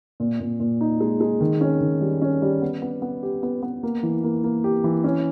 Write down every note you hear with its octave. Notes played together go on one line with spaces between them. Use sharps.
A#2
A#2
A#2
D#4
G#3
G#3
D#3
C#4
D#3
G3
C#4
G3
B3
B3
B3
G4
B3
B3
A#3
E3
A#3
A#3
G4
E3
C#4